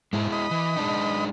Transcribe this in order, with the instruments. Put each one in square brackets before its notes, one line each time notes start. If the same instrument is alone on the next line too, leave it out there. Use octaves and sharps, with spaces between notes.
[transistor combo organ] G#2 [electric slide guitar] G#3 E4
[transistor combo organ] D#5 B5
[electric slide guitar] E3
G#3 D4 D#4